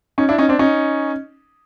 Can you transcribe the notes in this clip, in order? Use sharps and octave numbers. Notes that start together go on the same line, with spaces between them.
C#4 D#4
D4 E4
C#4 D#4
C4 D4
C#4 D#4